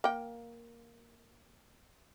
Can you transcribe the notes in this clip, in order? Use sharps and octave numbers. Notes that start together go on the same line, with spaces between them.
A#3 G5